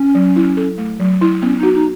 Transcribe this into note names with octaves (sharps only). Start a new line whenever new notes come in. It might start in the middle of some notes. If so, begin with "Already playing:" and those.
Already playing: C#4
F#3
E4
A4
A3
F#3
E4
B3 C#4
D#4 F#4
D#4